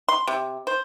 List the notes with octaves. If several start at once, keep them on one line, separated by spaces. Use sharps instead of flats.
C6
C3
C5